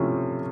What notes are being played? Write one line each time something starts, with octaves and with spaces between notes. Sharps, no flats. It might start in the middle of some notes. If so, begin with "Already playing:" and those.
Already playing: C3 F3 A3 C#4 E4